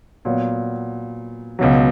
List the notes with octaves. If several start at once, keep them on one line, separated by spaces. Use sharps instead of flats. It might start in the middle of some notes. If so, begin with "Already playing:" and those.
A#2 F#3 B3
C#2 B2 F#3